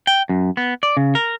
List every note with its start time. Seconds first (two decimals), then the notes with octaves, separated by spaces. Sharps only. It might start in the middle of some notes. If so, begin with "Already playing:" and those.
0.07 G5
0.29 F#2
0.57 B3
0.83 D5
0.97 C#3
1.15 A#4